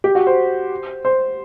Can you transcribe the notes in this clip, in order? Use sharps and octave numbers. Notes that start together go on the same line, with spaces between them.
G4
F#4
C5
C5